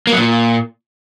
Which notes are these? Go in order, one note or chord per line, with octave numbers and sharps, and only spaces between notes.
A#3
F#3
A#2